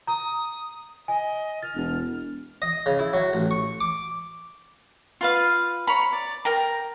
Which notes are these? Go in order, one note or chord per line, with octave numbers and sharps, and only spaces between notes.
A#5 D#6
D#5 G#5
F6 A6
E1
D#5
C#3
E4
F#3
A1
C#6
D6
F4 B4 F5
C#5 A#5 B5
D5
A#4 G5 A#5